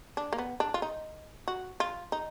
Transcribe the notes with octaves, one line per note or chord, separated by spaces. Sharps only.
D4
A#3
B3
D4
F4
D#4
F#4
F4
D#4